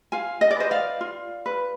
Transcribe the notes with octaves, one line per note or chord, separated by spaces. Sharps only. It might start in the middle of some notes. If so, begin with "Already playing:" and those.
F4 F5 G#5
D#5
D5
B4 C5 D#5
D5 F5
F4
B4